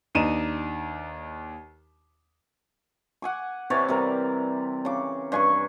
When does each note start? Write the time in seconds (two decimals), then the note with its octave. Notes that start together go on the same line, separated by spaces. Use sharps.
0.15 D#2 D4 D#4 B4 D#7 E7
3.22 F#5 G#5 D6
3.70 C3 E3 C#5 D5
3.88 C3 G3 A#4
4.85 C#3 D6
5.32 G2 G#5 C#6